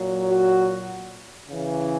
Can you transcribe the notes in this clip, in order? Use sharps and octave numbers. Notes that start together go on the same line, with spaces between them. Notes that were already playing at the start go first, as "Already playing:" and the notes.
Already playing: A#2 F#3
F#4
C#3 E3